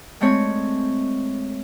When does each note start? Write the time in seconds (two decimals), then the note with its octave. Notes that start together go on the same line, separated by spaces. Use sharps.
0.21 G#3 A3 C4 C#5